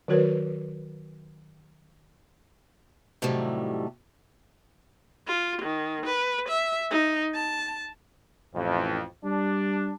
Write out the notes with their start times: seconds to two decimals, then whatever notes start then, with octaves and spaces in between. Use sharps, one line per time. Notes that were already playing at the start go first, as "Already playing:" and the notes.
0.08 D#3 F#3 F#4 A#4 B4 C#5
3.22 A2 C3 D#3 F#3 G3 A3
5.27 F4
5.62 D#3
6.05 B4
6.48 E5
6.90 D#4
7.34 A5
8.55 A1 F2
9.24 G3 D4